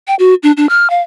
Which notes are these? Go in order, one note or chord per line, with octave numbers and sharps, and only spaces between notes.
G5
F#4
D4
D4
F6
F5